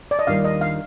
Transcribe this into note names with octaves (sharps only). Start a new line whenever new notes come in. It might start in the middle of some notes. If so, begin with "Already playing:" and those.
D5
D#5
D#2 D#3 G3 D4 F4 F5
D#5
F5